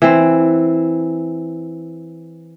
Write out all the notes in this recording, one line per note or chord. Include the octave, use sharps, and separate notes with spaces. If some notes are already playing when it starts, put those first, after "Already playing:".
E3 C4